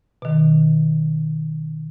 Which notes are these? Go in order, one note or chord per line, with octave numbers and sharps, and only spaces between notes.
B2 D#3